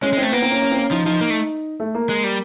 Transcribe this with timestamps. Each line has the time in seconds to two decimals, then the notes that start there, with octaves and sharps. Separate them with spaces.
0.02 G#3 C#4
0.13 G#3
0.17 A3 C4
0.32 A#3 B3
0.42 C4
0.51 C#4
0.62 C#4
0.71 C4
0.77 C#4
0.91 F3 D#4
1.06 F3 D#4
1.21 A#3
1.30 A3
1.80 A3
1.95 A#3
2.09 G#3
2.24 G3